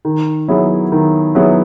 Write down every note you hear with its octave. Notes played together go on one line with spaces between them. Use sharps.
D#3
F#3 B3 E4 G#4
D#3
F#3 B3 E4 G#4